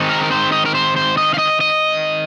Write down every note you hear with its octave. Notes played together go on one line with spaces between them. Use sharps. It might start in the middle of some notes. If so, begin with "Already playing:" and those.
Already playing: D#3 G#3 C4 D#4
A#4
A#4
C5
D#5
A#4
C5
C5
D#5
F5
D#5
D#5